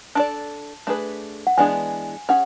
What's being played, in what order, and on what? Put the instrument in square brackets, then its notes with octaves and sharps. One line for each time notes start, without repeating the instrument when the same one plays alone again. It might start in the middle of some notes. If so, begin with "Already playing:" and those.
[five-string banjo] D4 A4 D5 [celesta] A5
[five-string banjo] A3 D4 G#4 B4
[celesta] F#5
[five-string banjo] E3 G#3 B3 D4 G#4 [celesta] G#5
[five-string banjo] C#4 G#4 [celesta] F#5